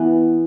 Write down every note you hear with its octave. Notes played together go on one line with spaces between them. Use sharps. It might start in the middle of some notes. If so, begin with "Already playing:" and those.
Already playing: E3 B3